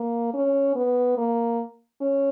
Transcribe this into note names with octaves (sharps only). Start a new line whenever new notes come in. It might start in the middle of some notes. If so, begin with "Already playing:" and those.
Already playing: A#3
C#4
B3
A#3
C#4